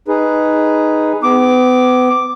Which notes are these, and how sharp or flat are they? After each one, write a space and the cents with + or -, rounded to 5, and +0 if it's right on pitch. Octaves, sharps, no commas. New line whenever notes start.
D#4 +0 G#4 +0 B4 +0
B3 +35 D6 +0